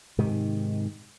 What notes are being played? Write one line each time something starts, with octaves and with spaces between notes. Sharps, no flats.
G#2 C3 D#3